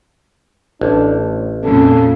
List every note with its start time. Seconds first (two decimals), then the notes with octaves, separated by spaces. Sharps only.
0.81 A1 D4
1.15 A2
1.65 F2 A#2 C#3 A4